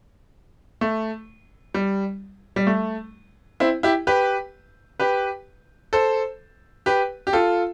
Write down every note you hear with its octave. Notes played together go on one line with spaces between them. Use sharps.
A3
G3
G3
A3
C4 E4
E4 G4
G4 B4
G4 B4
A4 C5
G4 B4
G4
F4 A4